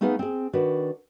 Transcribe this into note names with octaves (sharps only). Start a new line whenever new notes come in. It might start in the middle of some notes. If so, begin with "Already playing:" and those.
A3 B3 D#4 G#4 B4 F5
C4 G#4
D#3 D4 F#4 B4